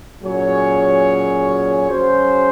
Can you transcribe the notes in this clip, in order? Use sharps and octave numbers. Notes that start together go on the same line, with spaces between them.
A#2 F#3 C#4 G#4 C#5
F#3 C#4 G#4 C5